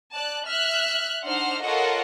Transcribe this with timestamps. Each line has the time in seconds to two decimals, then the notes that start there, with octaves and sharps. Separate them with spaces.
0.13 D5 A5 F#6
0.46 E5 F6 F#6
1.25 D4 D#4 C5 F#5 F6
1.62 F4 A4 A#4 C#5 D#5 F#5